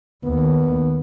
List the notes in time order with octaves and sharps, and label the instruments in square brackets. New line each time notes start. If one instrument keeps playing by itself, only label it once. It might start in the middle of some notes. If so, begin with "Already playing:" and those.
[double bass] D#2 [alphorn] B3